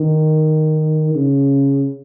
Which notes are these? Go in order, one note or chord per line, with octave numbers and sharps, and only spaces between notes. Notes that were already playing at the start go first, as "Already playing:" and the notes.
Already playing: D#3
C#3